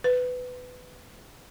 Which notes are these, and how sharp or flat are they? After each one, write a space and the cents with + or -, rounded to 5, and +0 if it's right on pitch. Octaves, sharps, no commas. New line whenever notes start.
B4 +15